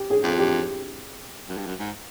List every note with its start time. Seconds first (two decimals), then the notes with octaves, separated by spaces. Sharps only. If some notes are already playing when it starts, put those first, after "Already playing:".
Already playing: G4
0.10 G#4
0.24 F2
0.39 G4
1.49 F#2
1.58 G2
1.67 F#2
1.79 G#2